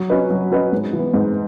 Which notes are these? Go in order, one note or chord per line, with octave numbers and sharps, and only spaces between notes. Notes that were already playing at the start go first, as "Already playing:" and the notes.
Already playing: F#3
C#4 F#4 B4 D#5
F#3
C#4 F#4 B4 D#5
G#2
E3 B3
G#2